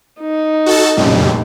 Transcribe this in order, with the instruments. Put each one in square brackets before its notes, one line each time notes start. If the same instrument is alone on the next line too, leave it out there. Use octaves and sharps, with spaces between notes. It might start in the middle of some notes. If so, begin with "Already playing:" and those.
[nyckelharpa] D#4
[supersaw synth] F#4 A4 A5
[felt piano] F1 A#1 [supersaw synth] F#2 C#3 G3